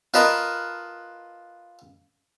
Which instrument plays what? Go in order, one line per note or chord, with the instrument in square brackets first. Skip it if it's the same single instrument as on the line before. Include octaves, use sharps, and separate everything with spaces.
[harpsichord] F4 A#4 B4 D#5 A5 B5